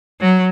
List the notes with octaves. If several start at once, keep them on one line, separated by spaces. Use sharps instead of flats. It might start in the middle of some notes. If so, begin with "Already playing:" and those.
F#3